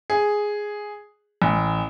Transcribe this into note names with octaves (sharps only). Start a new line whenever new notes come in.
G#4
A1